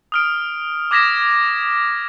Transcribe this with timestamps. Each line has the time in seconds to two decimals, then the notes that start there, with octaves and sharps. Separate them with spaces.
0.12 D#6 F6 D7
0.91 D6 D#6 G#6 A#6 B6 E7